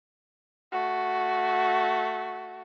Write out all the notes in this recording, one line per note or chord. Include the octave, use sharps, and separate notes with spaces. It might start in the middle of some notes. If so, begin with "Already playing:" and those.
A3 F#4